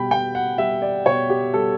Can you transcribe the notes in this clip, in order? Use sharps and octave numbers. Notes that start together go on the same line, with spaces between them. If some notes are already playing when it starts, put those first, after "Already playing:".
Already playing: B2 G3 G5 B5
B2 G5
F#5
G3 E5
D5
B2 C#5
G4
G3 A4